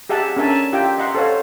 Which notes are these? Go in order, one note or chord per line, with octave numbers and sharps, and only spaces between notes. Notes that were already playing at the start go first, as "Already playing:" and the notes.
G4 G#4 E5 F#5 A5
C#4 D4 A#4 E5 G#5 A5
A5
F4 G4 E5 G5
D#5 E5 F#5 A#5 C6
A4 C5 C#5 F5